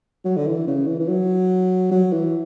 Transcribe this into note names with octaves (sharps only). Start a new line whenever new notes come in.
F#3
D3
E3
C#3
E3
E3
F#3
F#3
E3